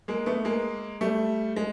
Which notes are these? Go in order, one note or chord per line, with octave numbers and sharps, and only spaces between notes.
G#3 A#3
A3 B3
G#3 A#3
G3 A3
G#3